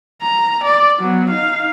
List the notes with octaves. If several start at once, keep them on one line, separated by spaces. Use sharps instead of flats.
A#5
D5
F#3 B3
D#4 F5